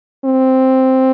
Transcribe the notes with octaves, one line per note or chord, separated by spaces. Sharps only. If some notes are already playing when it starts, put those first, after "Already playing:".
C4